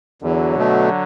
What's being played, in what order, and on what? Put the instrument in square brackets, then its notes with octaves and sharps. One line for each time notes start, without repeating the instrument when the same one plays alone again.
[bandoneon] E2 [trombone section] D3 F#3
[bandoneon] B2 A3